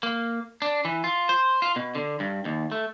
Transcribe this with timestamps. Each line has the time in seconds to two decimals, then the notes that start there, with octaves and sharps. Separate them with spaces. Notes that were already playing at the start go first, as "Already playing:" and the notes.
0.03 A#3
0.62 D4
0.85 E3
1.04 F4
1.29 C5
1.62 F4
1.76 B2
1.95 D3
2.20 G2
2.45 D#2
2.72 A3